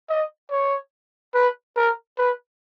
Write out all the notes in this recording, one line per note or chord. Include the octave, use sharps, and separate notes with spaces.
D#5
C#5
B4
A#4
B4